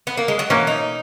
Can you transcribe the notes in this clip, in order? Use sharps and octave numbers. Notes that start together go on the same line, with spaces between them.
B3
A#3
G#3
F#3
B2 E3 A#3 C#4
D#4